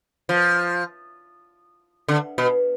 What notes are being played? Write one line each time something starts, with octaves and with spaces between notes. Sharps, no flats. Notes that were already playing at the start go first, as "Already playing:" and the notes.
F3
D3
B2